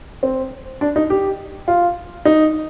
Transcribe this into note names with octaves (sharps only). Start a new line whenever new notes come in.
C4
D4
D#4
G4
F4
D#4